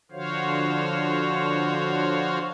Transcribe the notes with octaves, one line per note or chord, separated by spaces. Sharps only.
D3 F3 F#4 C5 C#5 F5